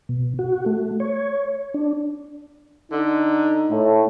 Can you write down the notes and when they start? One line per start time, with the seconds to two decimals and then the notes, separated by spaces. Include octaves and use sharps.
0.09 B2
0.39 F#4
0.66 A3
1.00 C#5
1.74 D4
2.92 D3 D#4
3.71 A2